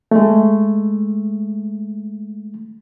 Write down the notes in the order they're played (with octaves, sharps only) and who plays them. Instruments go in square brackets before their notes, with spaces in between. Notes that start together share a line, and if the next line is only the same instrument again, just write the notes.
[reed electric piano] G#3 A3